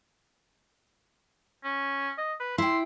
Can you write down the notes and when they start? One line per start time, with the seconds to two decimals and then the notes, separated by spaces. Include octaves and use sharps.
1.64 C#4
2.18 D#5
2.40 B4
2.58 E4 G5 C6